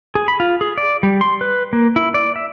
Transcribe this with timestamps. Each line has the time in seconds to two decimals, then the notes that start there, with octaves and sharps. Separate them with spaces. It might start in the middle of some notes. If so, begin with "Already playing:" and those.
0.15 G#4
0.28 B5
0.40 F4
0.61 G#4
0.78 D5
1.03 G3
1.21 C6
1.41 B4
1.73 A#3
1.96 E4
2.14 D5
2.36 E5